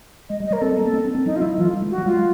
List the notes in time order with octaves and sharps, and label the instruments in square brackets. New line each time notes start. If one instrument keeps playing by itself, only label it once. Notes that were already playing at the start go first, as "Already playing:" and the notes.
[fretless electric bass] G#3 [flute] D#5
[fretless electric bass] G3
[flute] D#5
[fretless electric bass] G3 [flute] A#4
[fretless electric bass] C4 [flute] A4
[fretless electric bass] A#3
B3
C4
C#4
C4
[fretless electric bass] F#3 [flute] D#4
[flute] F4
[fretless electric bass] F#3 [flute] E4
[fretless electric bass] E3 [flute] F4
[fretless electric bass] G3
G#3
[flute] F#4
[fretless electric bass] F#3
[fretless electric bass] G3 [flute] F4
[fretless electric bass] G#3